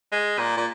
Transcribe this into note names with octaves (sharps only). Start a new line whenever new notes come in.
G#3
A#2
A#2